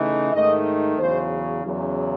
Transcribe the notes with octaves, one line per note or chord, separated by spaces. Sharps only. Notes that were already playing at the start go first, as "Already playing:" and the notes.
Already playing: C#3 E3 A3 D#4
G#2 D#3 A3 D#4 D#5
E2 C#3 F#3 C5
E2 C#3 F#3